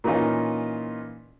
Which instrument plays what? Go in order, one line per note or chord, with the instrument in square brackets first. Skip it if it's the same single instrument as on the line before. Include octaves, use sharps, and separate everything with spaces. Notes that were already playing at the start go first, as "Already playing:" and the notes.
[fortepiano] A#2 E3 C#4 D#4 F4